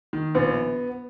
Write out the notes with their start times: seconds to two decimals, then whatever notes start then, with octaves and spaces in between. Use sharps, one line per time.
0.13 D#3
0.35 A#1 B3